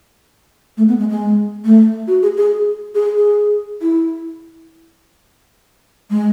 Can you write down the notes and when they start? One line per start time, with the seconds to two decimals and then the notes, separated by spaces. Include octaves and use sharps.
0.77 A3
0.88 B3
0.99 G#3
1.10 G#3
1.65 A3
2.07 F#4
2.23 G#4
2.37 G#4
2.95 G#4
3.16 G#4
3.82 E4
6.11 G#3